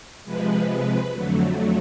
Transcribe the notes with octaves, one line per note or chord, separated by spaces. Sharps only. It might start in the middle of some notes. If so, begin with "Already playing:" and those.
C3 F3 G#3 B4
B4
F2 D3 F#3 A3